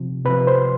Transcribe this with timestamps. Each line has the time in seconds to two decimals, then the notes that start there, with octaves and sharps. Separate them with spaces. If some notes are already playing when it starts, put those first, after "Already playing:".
Already playing: C3 F3
0.25 C3 B4
0.29 F3
0.47 C5